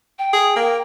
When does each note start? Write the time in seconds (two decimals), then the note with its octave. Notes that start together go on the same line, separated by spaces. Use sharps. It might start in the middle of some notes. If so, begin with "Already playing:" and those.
0.19 G5
0.33 G#4
0.56 A#3